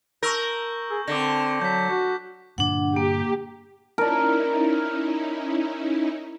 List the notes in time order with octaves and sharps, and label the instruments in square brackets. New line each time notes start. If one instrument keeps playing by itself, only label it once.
[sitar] A#4 [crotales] C#6 E6 G6
[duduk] G#4 [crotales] E6
[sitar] D3 [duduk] C4 [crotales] D6 A#6
[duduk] F#3 [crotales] G6 B6
[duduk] F#4
[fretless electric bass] G2 A#2 D3 [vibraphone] D4 F#5
[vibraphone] A#3 [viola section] G4
[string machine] C#4 D#4 E4 [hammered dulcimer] A#4 D5